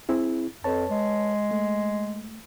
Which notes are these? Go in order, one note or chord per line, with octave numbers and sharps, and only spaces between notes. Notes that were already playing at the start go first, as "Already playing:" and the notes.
C4 E4 G#4
F2 B4 C#5 A5
G#3
A3